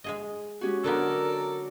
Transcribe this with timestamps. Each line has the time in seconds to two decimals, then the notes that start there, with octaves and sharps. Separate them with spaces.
0.04 G#3 G#4 D#5
0.61 G#3 C#4 F#4 G4
0.84 D3 F#3 B3 A4 A#4 D5